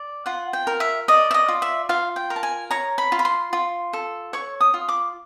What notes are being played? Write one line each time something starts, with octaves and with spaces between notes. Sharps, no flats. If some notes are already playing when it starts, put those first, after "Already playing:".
Already playing: D5
F4 F#5
G5
A#4
E5
D5 D#5
E5
D#5
F4
E5
F4 F5
G5
A#4
A5
G#5
C#5 A#5
B5
F4
B5
C6
F4
A4
C#5 C#6
D#6
F4
D6